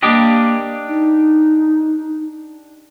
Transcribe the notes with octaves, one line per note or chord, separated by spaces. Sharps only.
A#3 D4 G4 D#5
D#4